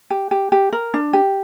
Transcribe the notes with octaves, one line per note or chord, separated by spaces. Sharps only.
G4
G4
G4
A#4
D4
G4